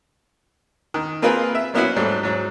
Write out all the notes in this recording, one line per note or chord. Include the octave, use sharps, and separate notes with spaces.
D#3
A#3 C4 F4 G#4 A#4 B4
E5
F#3 A#3 B3 C#4 E4 F#4
G#2 F#3 G3 A3
G#2 F#3